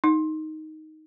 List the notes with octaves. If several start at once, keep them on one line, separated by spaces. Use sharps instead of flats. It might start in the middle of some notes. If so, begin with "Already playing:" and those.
D#4